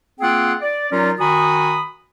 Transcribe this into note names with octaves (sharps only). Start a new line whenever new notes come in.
A#3 C4 F4 G#4 F#5 G5
D5
F#3 C#4 D#4 F4 A#4 D5
D#3 F#4 G#5 A#5 B5 D#6